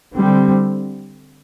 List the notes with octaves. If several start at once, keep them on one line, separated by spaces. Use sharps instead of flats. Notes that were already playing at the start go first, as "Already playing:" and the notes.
D3 G3 C4